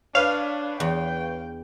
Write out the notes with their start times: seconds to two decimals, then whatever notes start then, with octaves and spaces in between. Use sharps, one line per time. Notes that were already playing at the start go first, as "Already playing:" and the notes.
0.15 D4 B4 C#5 F5
0.80 E2 G5